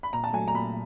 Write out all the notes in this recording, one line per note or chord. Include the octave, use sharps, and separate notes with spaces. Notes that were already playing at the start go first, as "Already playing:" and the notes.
B5
A#2 A#5
A5
F#3 A3 G#5
A#5
A#2 B5